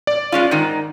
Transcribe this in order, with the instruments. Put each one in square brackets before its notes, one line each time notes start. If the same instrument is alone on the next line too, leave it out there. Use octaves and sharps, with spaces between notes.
[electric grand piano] D5
[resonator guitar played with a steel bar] G#3 C#4 F4
G#2 D#3